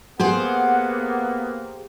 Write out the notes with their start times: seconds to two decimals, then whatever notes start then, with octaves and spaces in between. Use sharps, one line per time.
0.20 A#3 B3 G4 G#4 C5 F#5